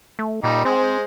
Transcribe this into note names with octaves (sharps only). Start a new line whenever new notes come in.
A3
A#2 G3 D#4
G#3 C4 C5